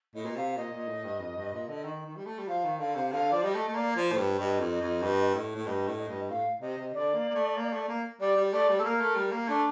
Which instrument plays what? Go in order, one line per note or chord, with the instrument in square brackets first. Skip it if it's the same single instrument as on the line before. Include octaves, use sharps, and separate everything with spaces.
[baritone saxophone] A2 [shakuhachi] D#5
[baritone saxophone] A#2
[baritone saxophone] C3 [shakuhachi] F5
[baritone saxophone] A#2 [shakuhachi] D#5
[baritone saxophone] A#2
A2
G2
F2
G2
A#2
D3
D#3
D#3
G3
A3
G3
[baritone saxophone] F3 [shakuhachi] F5
[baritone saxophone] D#3
[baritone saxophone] D3 [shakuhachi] F5
[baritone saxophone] C3
[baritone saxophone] D3 [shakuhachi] F5
[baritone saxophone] F3 [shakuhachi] D5
[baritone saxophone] G3 [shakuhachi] D#5
[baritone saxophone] A3
A3
[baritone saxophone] A#3 [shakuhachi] D5
[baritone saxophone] F3
[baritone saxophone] A2 [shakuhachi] C5
[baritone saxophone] G2
[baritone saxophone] G2 [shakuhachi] D#5
[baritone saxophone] F2
[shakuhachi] D#5
[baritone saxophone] F2
G2
A2
A2
[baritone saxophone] G2 [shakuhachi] D#5
[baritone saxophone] A2
[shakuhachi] D#5
[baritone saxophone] G2
[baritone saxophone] A2 [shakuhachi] F5
[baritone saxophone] C3 [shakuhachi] D#5
[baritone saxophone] C3
[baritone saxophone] D3 [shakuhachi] D5
[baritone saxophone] A#3
A#3
A3
A#3
A3
A#3
[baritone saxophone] G3 [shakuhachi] D5
[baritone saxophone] G3
[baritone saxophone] A3 [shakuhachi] D5
[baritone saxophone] G3
[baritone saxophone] A3 [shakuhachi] A4
[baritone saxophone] A#3 [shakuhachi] A#4
[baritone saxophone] A3
G3
A#3
[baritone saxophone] A3 [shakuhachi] D4